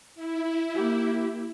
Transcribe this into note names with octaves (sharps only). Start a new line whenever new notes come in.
E4
A#3 G4